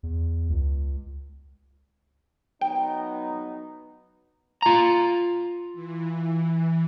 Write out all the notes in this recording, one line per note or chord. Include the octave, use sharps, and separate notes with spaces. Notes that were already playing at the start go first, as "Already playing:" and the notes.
E2
C#2
F#3 B3 D#4 G5
F4 A#5
E3